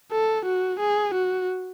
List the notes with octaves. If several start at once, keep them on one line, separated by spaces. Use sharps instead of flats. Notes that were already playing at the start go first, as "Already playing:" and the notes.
A4
F#4
G#4
F#4